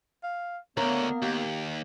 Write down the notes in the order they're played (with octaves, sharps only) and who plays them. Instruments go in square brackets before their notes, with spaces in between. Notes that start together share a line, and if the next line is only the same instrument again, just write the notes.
[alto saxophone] F5
[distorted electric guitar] D2 D3 [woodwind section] A#3 B3 [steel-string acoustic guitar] A#4 [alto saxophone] C#5
[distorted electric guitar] D#2 [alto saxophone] G4